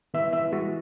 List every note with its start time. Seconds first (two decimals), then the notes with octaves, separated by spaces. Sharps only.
0.14 E3 E5
0.33 E3 E5
0.52 G#3 F#4